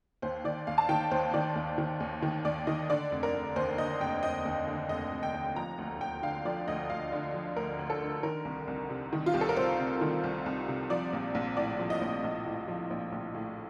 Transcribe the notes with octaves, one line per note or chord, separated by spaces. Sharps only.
D#2 C5
D#3 D5
D#2 F5
A5
D#3 G5
D#2 C5
D#3 D5
D#2
D#3
D#2
D#3
D#2 D5
D#3 D#5
D3 D5
F1
A#4
F1
D#2 C5
D3 D#5
F1 G5
F1 D#5
D#2
D3
F1 D#5
F1
G5
D#2
F3 A#5
D2
D2 G5
D3 F5
F3 D5
D2 D#5
D2 F5
D3
F3
D2 A#4
D2
A4
D3
D#3 A#4
C2
C2
C3
D#3
F4
C2 G4
A4
A#4
C2 C5
C3
D#3
C2
C2
C3
F3 D5
A#1
A#1
A2 D5
F3
D#5
A#1
A#1
A2
F3
A#1
A#1
A2